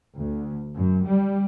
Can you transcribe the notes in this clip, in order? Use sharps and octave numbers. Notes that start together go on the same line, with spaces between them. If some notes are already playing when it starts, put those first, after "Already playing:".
D2
F#2
G3